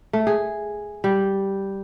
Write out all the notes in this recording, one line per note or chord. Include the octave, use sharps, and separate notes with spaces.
A3
G#4
G3